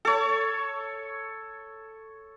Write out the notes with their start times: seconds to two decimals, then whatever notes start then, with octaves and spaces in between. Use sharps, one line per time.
0.05 A4 C#5